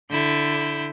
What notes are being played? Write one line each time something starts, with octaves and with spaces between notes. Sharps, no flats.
D3 E4 G6